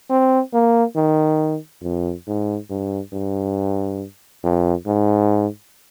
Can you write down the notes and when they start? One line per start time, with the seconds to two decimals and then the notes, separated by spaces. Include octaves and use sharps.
0.09 C4
0.54 A#3
0.96 D#3
1.83 F2
2.27 G#2
2.70 G2
3.13 G2
4.44 F2
4.86 G#2